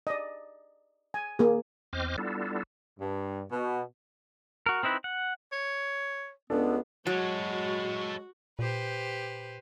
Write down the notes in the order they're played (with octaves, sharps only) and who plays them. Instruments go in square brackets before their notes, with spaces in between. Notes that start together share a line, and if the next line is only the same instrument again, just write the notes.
[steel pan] D5 D#5
G#5
A#3 G#4
[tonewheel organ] E2 C4 C5 D#5 D6 F6
G3 B3 D4 E4 F4 A4
[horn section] G2
B2
[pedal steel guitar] F#4 A#4
C4 D#4 E4 B4
F#5
[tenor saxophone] C#5
[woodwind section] C#2 B3 [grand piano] D4 A4
[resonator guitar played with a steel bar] F#3 [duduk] G#3 [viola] F#4 [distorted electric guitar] A4 C#5
[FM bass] A#2 [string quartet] G4 B4 C5